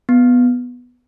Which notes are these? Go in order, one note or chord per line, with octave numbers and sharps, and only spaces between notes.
B3